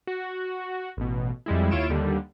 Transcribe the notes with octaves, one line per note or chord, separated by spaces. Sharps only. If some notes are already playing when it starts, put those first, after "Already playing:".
F#4
A1 B2
F2 G3 G#3 E4
D#2 E4 F4 C#5 D7 E7
D#2 D3 G3